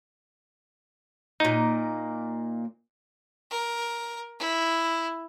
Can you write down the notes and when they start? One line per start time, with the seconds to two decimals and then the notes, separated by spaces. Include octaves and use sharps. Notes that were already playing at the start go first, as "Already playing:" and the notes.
1.40 A#2 A#3 D#4
3.50 A#4
4.39 E4